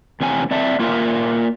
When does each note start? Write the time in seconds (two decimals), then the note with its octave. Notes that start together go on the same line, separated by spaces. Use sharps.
0.21 E2 C3 C#4 G#5
0.51 C4 D5 E5 A5
0.79 A#3 F4 A#4 E5 G#5